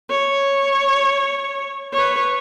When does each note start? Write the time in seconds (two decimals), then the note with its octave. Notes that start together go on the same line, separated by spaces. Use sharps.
0.10 C#5
1.93 B4 C#5